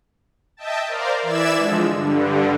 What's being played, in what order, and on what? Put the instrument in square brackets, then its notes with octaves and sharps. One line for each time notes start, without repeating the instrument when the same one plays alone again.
[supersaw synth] D#5 E5 G5 A5
A#4 C5 D5 F5
E3 D5 E5 E6 G#6 E7
D3 F3 G#3
G2 D3